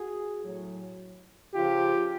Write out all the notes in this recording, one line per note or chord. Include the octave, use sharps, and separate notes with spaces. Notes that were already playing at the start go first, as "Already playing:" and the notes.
Already playing: F#4 G#4
A2 F#3
C#3 F3 F4 G4